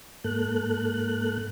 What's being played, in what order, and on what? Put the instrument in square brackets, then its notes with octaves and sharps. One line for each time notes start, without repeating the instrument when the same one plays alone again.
[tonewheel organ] G#2 A#3 A4 F#6